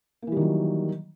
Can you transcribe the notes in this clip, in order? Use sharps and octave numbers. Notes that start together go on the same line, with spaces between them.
D#3 E3 F#3 G3 A#3